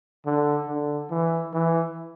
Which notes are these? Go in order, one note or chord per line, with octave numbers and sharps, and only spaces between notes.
D3
D3
E3
E3